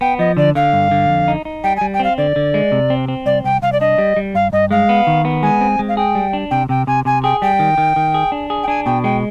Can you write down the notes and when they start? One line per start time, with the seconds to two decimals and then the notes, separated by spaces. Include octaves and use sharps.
0.01 B3 G5
0.19 F3 D#5
0.37 D3 D5
0.55 D3 F5
0.73 G2
0.91 D3
1.09 F2
1.28 D#4
1.45 D#4
1.64 G3 G5
1.77 G#5
1.81 G3
1.94 G5
2.00 C4 F5
2.18 D3 D5
2.36 D3
2.54 G#3
2.72 C3
2.90 C4
3.08 C4
3.26 C2 D5
3.44 C2 G5
3.62 C2 F5
3.72 D5
3.80 D4 D#5
3.98 G3
4.16 G3
4.34 G2 F5
4.53 G2 D#5
4.71 G#3 F5
4.89 B3
5.07 D#3
5.25 B3
5.43 G#3 G#5
5.61 C4
5.79 G#3
5.89 F5
5.97 G#4 G5
6.15 G3
6.33 D4
6.51 C3 G5
6.69 C3 G5
6.87 C3 G#5
7.05 C3 G#5
7.24 G#4 G5
7.42 G3 G5
7.59 D#3
7.78 D#3
7.96 D#3
8.14 G#4
8.32 D4
8.50 G#4
8.63 G5
8.68 D4 G#5
8.86 B2 G5
9.04 G#3 G5